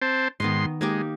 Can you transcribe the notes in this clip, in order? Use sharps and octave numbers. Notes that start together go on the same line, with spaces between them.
C4 C5 A5
G#2 D#3 B3 D#5 C6
G#3 A#3 D#4 G4